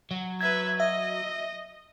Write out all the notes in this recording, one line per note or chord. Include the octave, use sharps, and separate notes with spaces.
F#3
B4 E5 G#6
D#5 E5